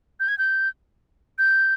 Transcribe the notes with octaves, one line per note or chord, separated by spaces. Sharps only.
G6
G#6
G6
G6